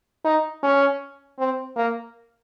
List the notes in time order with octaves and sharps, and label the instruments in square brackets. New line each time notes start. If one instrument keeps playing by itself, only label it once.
[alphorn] D#4
C#4
C4
A#3